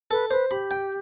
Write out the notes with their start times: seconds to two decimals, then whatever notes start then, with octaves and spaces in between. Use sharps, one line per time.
0.11 A4 B4
0.31 B4 C5
0.51 G4 B5
0.71 G5